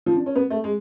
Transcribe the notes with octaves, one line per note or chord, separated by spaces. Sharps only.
F3
D4
C#4
B3
A3
G#3